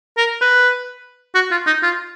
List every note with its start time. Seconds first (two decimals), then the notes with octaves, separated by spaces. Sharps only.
0.17 A#4
0.41 B4
1.35 F#4
1.51 F4
1.67 D#4
1.83 F4